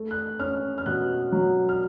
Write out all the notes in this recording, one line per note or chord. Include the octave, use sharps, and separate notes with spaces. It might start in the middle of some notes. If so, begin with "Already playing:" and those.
Already playing: A3
F#6
C#4 F6
F6
B2 F#6
F#3
F6